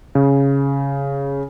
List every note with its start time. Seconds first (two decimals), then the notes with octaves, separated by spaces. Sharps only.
0.15 C#3